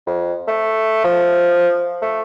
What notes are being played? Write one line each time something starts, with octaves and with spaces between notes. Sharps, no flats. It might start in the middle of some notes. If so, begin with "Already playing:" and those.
F2
A3
F3
A3